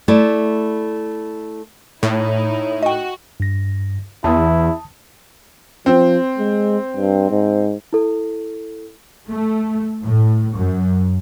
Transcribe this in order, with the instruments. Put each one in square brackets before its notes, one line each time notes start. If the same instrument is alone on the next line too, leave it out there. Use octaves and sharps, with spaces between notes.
[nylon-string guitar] A3 E4 D5
[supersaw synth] A2 [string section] D#4 E4 [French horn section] C#5
[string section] F#4 [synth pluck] D#5 G5
[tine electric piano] G2 A#6
[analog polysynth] E2 [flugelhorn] E4 [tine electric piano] A5 D#6
[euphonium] F3 [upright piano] C4
[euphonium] G#3
G2
G#2
[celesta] E4 A4
[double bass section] A3
A2
F#2